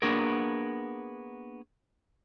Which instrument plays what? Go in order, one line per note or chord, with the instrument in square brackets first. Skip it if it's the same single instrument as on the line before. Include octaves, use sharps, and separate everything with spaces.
[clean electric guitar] A#3 B3 D4 F#4 G#4 A#4